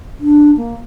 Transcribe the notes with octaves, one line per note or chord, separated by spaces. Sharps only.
D4
A#3